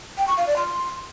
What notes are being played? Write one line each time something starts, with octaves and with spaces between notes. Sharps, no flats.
G5
C#6
F5
D5
C6